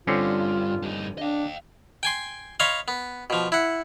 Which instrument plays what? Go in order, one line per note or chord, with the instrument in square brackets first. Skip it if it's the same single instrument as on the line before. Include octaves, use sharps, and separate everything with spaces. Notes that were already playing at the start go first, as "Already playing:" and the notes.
[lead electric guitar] G2 [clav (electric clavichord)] D3 C4 C#4 [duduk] F4
[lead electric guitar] G2 D#4
[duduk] D4 [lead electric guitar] D#5 F5
[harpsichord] G5 G#5 C6
C#5 D#5 F5 B5 C6
B3
B2 F3
E4 F#5